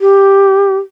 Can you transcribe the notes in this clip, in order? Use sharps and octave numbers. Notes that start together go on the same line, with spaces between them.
G4